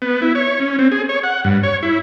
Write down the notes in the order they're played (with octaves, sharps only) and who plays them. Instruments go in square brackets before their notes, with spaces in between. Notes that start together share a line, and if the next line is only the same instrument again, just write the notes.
[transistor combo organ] B3
E4
C#5
C#4
C4
G#4
C#5
F#5
G2
C#5
E4